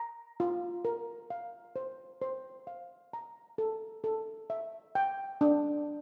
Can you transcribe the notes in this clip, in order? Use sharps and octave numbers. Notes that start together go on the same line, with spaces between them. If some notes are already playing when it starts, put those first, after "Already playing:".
Already playing: A#5
F4
A#4
F5
C5
C5
F5
A#5
A4
A4
E5
G5
D4